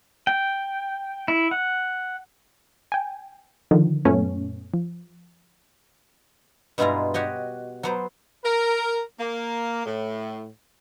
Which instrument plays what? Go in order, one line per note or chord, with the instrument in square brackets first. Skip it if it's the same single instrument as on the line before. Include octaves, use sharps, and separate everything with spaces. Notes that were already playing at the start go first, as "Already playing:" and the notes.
[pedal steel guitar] G5
E4
F#5
[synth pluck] G5 G#5
D3 D#3 F3
F#2 A#2 A3 B3 C#4
F3
[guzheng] G2 B2 G#3 E4 F4 A#5
F#4 G4 C#5 D#5
F#3 B3 C5
[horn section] A#4
A#3
A2